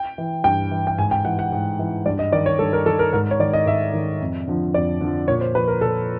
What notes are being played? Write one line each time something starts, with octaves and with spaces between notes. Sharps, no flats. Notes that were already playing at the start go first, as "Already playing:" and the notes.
Already playing: G5
E3
G2 G5
E3
G5
G#2 G#5
G5
E3 F#5
F#5
G#2
E3
G2 D5
D#5
D#3 D5
C#5
G2 A4
A#4
D#3 A4
A#4
G#2 A#4
C#5
D#3 D5
D#5
G#2 E5
D#3
F2
D3 F3
F2 D5
D3 F3
A#2 C#5
C5
F3 B4
A#4
A#2 A4